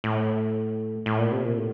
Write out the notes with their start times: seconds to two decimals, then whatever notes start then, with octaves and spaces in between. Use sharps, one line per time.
0.04 A2
1.06 A2
1.18 A#2
1.32 C3
1.44 A#2
1.57 A2